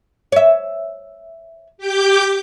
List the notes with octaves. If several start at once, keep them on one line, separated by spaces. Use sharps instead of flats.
C#5 E5
G4 D6 G6